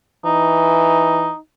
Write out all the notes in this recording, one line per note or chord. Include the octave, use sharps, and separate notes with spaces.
E3 D#4